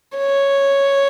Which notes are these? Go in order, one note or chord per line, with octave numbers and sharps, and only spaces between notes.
C#5